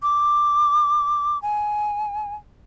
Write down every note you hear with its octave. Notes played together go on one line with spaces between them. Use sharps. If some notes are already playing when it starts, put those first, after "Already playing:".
D6
G#5